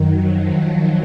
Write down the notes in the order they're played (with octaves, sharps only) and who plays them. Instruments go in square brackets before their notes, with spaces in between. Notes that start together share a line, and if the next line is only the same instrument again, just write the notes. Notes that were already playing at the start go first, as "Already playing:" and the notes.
Already playing: [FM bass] F#2 [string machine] D#3 F#3
[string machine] F3